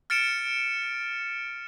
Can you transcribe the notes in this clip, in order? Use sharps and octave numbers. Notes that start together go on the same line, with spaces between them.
F6 A6 C#7 D7 E7